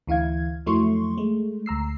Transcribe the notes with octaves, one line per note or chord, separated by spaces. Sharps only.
D2 E3 E4 F5 G#6
F2 F#3 A3 E4 C6 C#6
G#3 A3
D2 A#5 E6 C7